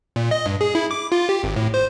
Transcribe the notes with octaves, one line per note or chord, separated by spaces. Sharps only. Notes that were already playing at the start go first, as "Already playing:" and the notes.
A#2
D#5
G2
G#4
E4
D6
F4
G4
G#1
A2
C5